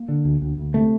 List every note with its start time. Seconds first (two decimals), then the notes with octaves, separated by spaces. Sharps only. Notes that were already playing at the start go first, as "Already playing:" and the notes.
Already playing: A#3
0.08 D3
0.25 D2
0.42 D2
0.58 D2
0.74 C3 A3